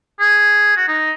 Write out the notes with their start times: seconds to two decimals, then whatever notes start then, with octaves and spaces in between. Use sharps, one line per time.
0.20 G#4
0.77 F#4
0.88 D#4